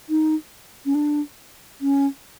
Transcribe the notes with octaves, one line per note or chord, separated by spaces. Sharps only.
D#4
C#4
D4
C#4